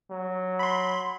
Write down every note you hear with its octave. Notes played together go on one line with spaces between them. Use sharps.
F#3
B5 C6